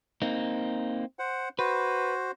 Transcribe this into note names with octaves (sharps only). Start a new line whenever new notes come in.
A#3 C4 D#4
C5 F#5
F#4 B4 C5